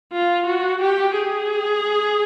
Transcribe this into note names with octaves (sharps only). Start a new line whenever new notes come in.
F4
F#4
G4
G#4